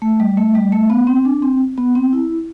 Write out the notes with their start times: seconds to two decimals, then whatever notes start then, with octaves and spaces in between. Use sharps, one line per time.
0.02 A3
0.20 G3
0.37 A3
0.55 G3
0.72 A3
0.90 B3
1.07 C4
1.25 D4
1.42 C4
1.78 B3
1.95 C4
2.13 E4